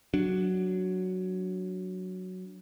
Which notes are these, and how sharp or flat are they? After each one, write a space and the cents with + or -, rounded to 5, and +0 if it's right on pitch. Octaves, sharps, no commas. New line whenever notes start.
F#3 +0 D4 +0